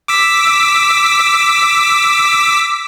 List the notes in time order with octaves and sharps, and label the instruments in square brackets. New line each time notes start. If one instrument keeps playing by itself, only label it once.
[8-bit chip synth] D6 E6 B6